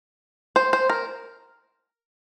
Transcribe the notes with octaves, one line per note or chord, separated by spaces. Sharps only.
C5
C5
A#4